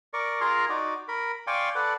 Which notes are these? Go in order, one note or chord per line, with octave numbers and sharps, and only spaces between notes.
A#4 D5 C#6
F4 G#4 A#4 A#5 C6 F6
D#4 F#4 D5
A#4 B5
D5 F5 G5 G#5 C6 C#6
A4 B4 D5 F#5